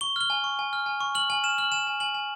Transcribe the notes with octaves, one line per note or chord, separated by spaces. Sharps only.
C#6 G7
F6 G7
G#5
C#6
G#5
F6
G#5
C#6
F6 F#7
G#5 F#7
F6 E7
F6 F#7
G#5 E7
G#5
G#5 F#7
G#5